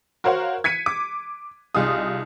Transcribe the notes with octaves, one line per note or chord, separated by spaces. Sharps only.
F#4 A#4 C5 C#5 F5 F#5
G#6 B6 C#7 D#7
D6
C2 D#4 F4 G#4 D#6